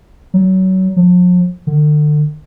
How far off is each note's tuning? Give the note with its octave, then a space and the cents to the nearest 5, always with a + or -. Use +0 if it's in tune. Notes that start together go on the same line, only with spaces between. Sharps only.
F#3 +25
F3 +45
D3 +35